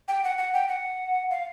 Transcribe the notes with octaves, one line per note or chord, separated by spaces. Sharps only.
G5
F#5
F#5
G5
F#5
F5